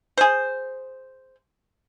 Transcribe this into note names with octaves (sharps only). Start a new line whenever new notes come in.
G#4 C5